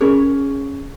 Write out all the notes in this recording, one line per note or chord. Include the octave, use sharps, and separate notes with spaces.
C#4 G#4 A#4 C#5